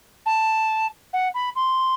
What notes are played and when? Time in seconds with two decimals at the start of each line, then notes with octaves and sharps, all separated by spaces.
0.26 A5
1.13 F#5
1.34 B5
1.56 C6